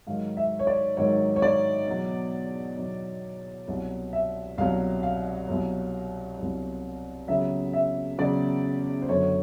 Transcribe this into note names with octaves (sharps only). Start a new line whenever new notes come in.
G#2 D#3 F#3 F5
E5
C#5
D5
G#2 D#3 F#3 C#5
C#5
D5
E2 B2 F#3
E2 B2 F#3
C2 B2 F#3
E5
C2 B2 F#3 F5
F5
C2 B2 F#3
C2 B2 F#3
E2 C#3 F#3 E5
E5
E2 C#3 F#3 D5
C5
F#2 D3 F#3 C#5